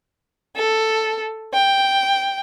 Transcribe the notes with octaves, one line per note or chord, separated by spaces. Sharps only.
A4
G5